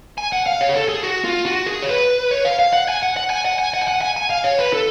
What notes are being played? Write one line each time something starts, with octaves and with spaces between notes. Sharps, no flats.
G#5
F#5
F5
C#5
G#4
A4
G#4
F#4
F4
F#4
G#4
C#5
B4
C#5
F5
F5
F#5
G#5
F#5
F#5
G#5
F#5
G#5
F#5
G#5
F#5
G#5
G#5
F5
C#5
B4
A4